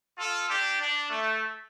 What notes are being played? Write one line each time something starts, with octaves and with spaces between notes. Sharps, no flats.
F4 A4
D4 G4
D4
A3